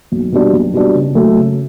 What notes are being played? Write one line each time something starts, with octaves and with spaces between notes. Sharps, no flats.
B1
B2 G3 D4
B1
B2 G3 D4
C#3
F#3 A3
C#3